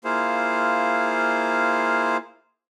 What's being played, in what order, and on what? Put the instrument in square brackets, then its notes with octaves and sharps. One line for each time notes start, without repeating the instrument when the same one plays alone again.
[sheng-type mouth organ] A#3 E4 F4 G#4 C5 F5